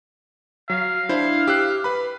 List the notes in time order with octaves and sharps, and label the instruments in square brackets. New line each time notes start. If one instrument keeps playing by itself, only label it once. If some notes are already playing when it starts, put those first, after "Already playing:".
[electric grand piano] F#3 [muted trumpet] F5
[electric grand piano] D4 E4 C5
G4 E6 F#6
B4 B5